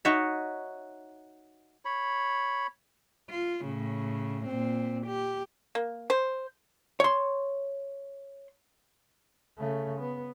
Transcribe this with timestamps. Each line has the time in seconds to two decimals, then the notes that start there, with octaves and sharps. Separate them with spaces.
0.05 D#4 F#4 C#5 E5
1.85 C#5 B5
3.30 F4
3.65 A2 C#3
4.47 A#2 C4
5.07 G4
5.75 A#3
6.10 C5
7.00 C#5 C6
9.58 C#3 A3
10.00 B3